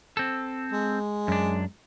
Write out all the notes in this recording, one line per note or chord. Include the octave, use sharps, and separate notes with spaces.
C4 A4
G#3
F#2 D4